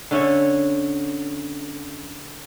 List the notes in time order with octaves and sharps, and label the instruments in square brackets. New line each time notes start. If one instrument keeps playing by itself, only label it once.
[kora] D3 C#4 E5